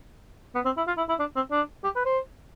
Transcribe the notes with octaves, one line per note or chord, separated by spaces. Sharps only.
B3
C4
E4
F4
E4
E4
D4
C4
D4
G4
B4
C5